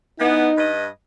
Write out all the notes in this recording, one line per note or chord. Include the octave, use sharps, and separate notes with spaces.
E3 B3 D#4
G2 B4 D#5